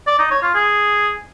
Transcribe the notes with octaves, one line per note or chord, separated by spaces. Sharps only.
D5
D#4
C#5
F4
G#4